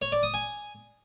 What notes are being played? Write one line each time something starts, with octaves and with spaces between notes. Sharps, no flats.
C#5
D5
D#6
G#5